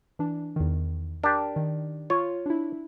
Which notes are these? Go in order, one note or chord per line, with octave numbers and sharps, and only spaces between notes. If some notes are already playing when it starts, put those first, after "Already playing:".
E3 D4
E2 D#3
D4 G4 A#4
D#3
F4 C#5
D4 E4